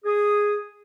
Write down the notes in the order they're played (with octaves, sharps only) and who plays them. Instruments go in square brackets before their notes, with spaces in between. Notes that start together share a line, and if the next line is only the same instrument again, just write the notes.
[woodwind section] G#4 D#6